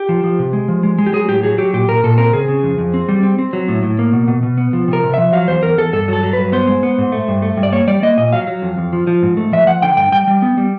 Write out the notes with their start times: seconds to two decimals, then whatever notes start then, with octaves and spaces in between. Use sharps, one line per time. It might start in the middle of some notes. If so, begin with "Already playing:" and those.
Already playing: G4
0.09 F3
0.24 F3
0.39 C3
0.53 G#3
0.68 F3
0.83 G#3
0.99 G#3
1.07 G4
1.13 F#3 G#4
1.28 A2 G4
1.43 F#3 G#4
1.58 F#3 G4
1.73 A#2 G4
1.88 A#2 A#4
2.03 A#2 A4
2.18 C4 A#4
2.33 C#3 G#4
2.48 C#3
2.63 F2
2.78 F2
2.94 C4
3.09 G3
3.23 C4
3.39 C4
3.53 F#3
3.68 A2
3.83 A2
3.99 A#3
4.13 B2
4.28 B2
4.43 B2
4.58 B3
4.73 F3
4.88 C3
4.93 A#4
5.04 C3
5.14 F3 E5
5.33 F#3 F5
5.48 E2 C5
5.63 E2 A#4
5.78 E2 A4
5.93 G2 A4
6.08 F#3 A4
6.23 F#3
6.33 G2 B4
6.52 B3 C5
6.67 G#3
6.83 B3
6.98 G#2
7.12 A3
7.28 G2
7.42 A3
7.57 G2
7.63 D5
7.73 A#3 C#5
7.88 G3 D5
8.03 A#3 D#5
8.17 A#2 D#5
8.33 F#3 F5
8.47 F#3
8.62 F2
8.78 F2
8.93 F3
9.07 F3
9.22 G#2
9.37 A3
9.53 F3 E5
9.67 F3 F#5
9.82 D3 G5
9.97 G2 G5
10.12 G3 G5
10.27 G3
10.42 B3
10.57 G3